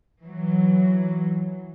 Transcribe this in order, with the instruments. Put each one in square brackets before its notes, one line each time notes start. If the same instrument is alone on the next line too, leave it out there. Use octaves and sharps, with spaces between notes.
[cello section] E3 F#3